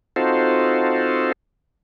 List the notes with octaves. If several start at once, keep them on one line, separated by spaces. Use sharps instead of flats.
C4 D#4 F4 F#4 A4 C5